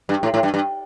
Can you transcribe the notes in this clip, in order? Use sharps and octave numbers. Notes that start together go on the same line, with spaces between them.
G2
A2
A2
G2
G2